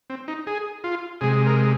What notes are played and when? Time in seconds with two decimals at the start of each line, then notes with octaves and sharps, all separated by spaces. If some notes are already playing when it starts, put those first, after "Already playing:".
0.10 C4
0.28 D#4
0.47 G#4
0.84 F4
1.21 C3 G#3 G#4
1.46 A#4